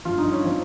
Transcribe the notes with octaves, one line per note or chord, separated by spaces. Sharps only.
G2 F3 F4
D#4
C#4
F3 C4